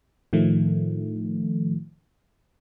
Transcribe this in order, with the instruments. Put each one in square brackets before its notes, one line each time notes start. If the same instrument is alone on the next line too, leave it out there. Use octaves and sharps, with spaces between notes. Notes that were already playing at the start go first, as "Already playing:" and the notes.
[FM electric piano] A2 D#3 F3 A3